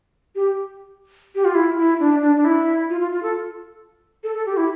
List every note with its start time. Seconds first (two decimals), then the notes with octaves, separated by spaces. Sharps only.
0.35 G4
1.35 G4
1.45 F4
1.55 E4
1.78 E4
2.00 D4
2.22 D4
2.37 D4
2.45 E4
2.90 F4
3.01 F4
3.12 F4
3.23 A4
4.24 A4
4.35 A4
4.46 G4
4.57 E4